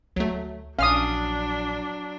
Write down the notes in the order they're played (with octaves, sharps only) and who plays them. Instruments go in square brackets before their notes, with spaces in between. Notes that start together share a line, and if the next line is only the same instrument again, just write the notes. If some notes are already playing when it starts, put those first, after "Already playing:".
[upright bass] D2 [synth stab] F#3 A3
[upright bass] A#1 [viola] F#3 D4 [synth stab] C#4 F6 [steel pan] F5 D#6